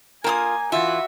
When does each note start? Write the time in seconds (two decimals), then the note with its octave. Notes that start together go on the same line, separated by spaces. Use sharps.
0.24 A#3 F4 A#4 G5 G#5 D#6
0.72 E3 F4 F#4 E5